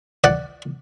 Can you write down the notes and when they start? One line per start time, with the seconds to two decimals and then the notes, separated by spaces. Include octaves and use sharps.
0.24 D5 F#5